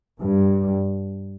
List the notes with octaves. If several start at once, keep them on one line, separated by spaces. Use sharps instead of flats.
G2